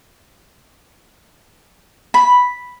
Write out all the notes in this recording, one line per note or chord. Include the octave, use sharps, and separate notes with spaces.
B5